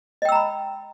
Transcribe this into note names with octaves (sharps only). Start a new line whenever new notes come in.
D#5 G5 A#5 B5 E6